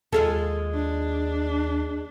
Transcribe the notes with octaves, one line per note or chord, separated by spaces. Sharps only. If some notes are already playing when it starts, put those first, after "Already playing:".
D#2 G#3 F4 G#4 A4
D4